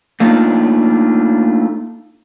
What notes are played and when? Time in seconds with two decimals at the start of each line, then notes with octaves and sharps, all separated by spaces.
0.20 A3 A#3 D4 D#4 F4